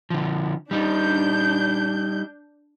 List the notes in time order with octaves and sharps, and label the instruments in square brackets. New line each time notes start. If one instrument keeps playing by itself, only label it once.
[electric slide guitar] D3 F3
[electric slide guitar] G3 D#4 [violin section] D4 G6